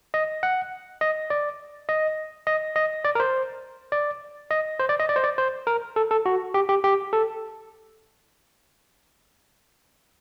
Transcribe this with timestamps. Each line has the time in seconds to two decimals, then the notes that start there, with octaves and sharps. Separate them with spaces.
0.14 D#5
0.43 F#5
1.01 D#5
1.30 D5
1.89 D#5
2.47 D#5
2.76 D#5
3.04 D5
3.15 A#4
3.20 C5
3.92 D5
4.51 D#5
4.80 C5
4.89 D5
5.00 D#5
5.09 D5
5.16 C5
5.24 D5
5.38 C5
5.67 A#4
5.96 A4
6.11 A4
6.26 F#4
6.54 G4
6.69 G4
6.84 G4
7.13 A4